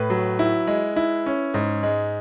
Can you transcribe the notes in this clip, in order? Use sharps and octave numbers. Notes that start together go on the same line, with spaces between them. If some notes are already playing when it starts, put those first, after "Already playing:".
Already playing: A2 B4
F#3
E4
G#3
E4
C#4
G#2
G#3